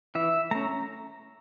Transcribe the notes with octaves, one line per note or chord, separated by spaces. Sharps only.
E3 E5
A3 C#4 A#5